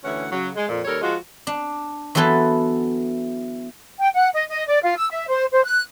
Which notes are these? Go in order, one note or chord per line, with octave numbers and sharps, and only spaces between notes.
D2 E3 C#4 E4 F#5
C#3 F#3
G#3
F2 A#2
D#2 G3 A4 A#4 C#5
F3 G#3 F4 F#4
D4
E3 F#3 B3 A4 B4 C6
G5
F#5
D#5
D#5
D5
F4
E6
E5
C5
C5
F#6